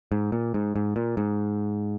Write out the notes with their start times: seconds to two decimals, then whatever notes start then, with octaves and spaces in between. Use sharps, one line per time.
0.12 G#2
0.32 A#2
0.54 G#2
0.76 G#2
0.96 A#2
1.17 G#2